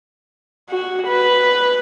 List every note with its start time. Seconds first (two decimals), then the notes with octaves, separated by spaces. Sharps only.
0.70 F#4
1.08 B4